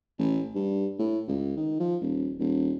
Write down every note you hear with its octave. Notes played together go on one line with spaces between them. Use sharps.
A1
G2
A2
C#2
D#3
F3
D#1
D#1